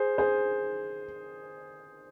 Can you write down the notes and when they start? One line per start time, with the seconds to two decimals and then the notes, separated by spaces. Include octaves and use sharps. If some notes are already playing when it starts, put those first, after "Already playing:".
Already playing: G#4 C5
0.18 G#4 C5